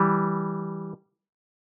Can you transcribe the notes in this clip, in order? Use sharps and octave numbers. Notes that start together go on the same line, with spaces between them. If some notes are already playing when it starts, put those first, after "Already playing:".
Already playing: E3 G3